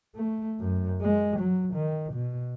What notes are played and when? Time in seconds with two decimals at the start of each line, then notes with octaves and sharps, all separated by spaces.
0.15 A3
0.60 F#2
1.02 G#3
1.39 F#3
1.74 D#3
2.14 B2